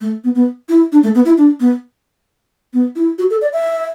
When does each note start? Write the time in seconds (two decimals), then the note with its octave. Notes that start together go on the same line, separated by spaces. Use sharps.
0.01 A3
0.24 B3
0.35 B3
0.69 E4
0.92 D4
1.03 A3
1.15 B3
1.25 E4
1.37 D4
1.60 B3
2.73 B3
2.96 E4
3.18 F#4
3.30 A4
3.41 D5
3.53 E5